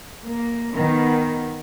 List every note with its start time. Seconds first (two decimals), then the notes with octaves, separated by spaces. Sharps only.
0.23 A#3
0.73 D#3 B3